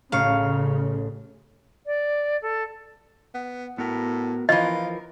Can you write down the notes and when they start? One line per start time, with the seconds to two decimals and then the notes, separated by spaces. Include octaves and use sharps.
0.12 A1 C#3 F5 C#6
1.86 D5
2.42 A4
3.34 B3
3.78 A2 B3 F#4 A#4
4.49 E3 F3 F4 A#4 D#5